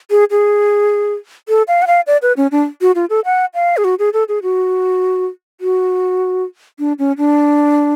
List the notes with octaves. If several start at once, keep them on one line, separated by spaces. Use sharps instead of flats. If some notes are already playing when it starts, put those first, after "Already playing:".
G#4
G#4
A4
F5
F#5
F5
D5
B4
C#4
D4
F#4
F4
A4
F#5
F5
G#4
F#4
G#4
A4
G#4
F#4
F#4
D4
C#4
D4